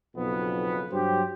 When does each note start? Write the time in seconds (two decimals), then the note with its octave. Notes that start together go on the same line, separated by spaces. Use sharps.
0.17 B1 F2 C#3 B3
0.91 G2 F#3 G4 C5